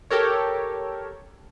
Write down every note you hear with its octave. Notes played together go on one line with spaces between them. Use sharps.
G4 A4 A#4 C#5